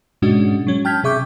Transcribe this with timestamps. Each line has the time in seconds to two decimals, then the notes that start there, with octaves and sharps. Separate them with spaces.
0.22 G#2 B2 G#3 C#4 D4 F#4
0.67 F#3 C#4
0.85 G5 A5 F6 G6 G#6 B6
1.04 C3 G#4 E5 C#6 D6 G6